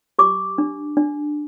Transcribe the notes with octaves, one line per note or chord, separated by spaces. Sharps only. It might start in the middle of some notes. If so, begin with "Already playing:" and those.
G4 D6
D4
D4